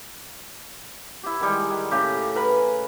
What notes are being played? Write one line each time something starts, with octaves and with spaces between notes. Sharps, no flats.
E4 G4
D#3 G3 G#3
G#3
A2 C#3 G4
A#4 B4 G#5 B5